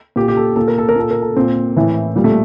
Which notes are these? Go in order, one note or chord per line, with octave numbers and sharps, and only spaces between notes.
A#2 G4
G4
A4
A#2 A4
A#4
A4
A#4
A#2 A4
A#4
A4
A#2 C4
A2 E3
A#2 G3
A3